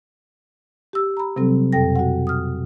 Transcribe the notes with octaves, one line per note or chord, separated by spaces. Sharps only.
G4 E6
A#5 B5
C3 F#3 G3 C4 A4
F2 B2 A4 G5 A#6
F#4 F#5
D#6 F6